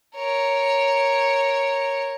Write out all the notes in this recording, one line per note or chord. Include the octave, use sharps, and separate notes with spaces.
A#4 C#5